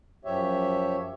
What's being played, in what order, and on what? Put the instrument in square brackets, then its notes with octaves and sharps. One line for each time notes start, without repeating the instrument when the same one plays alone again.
[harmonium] F#2 F3 G4 C#5 E5